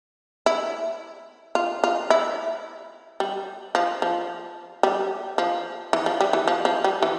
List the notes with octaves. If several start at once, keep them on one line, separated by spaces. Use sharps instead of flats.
E4
F4
F4
E4
G3
F3
F3
G3
F3
E3
F3
G3
E3
F3
F3
G3
E3